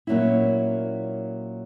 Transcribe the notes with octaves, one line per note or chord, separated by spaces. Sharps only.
A#2 F#3 A#3 C#4 E4